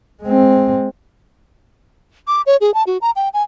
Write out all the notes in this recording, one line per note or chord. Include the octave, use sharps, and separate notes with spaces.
G#3 C4
D6
C#5
G#4
A5
F#4
A#5
G5
G#5